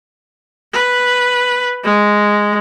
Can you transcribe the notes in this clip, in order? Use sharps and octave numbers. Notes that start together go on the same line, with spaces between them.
B4
G#3